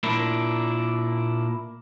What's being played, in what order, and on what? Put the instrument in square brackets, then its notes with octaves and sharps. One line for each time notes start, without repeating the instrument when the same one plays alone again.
[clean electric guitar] A#2 A#3 D4 E4